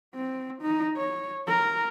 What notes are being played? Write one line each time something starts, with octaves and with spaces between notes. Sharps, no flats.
C4
D#4
C#5
A#4